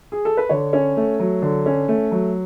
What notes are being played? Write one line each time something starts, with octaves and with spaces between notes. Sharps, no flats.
G#4
A4
B4
D3 C#5
C#4
A3
F#3
D3
C#4
A3
F#3